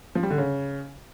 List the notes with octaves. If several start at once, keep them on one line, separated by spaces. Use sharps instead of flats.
F3
G3
D3
C#3